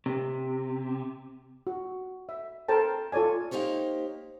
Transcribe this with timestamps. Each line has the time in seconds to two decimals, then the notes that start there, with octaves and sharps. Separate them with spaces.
0.06 C3
1.67 F#4
2.29 E5
2.69 A4 A#4 C5 G5 A5
3.12 F4 A4 C#5 D5 G#5
3.51 A#3 D#4 G4 C5 C#5